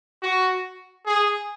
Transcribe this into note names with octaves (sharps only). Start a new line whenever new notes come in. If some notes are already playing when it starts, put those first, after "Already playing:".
F#4
G#4